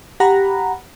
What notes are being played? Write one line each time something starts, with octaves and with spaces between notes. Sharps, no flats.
G4 F#5 A#5 B5